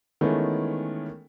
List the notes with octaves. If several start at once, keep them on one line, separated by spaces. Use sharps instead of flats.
D#3 E3 G#3 A3 B3 C#4